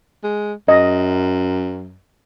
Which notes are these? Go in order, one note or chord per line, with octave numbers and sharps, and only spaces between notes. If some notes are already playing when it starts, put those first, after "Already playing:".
G#3
F#2 D#5